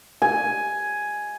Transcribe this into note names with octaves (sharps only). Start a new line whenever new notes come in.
G#5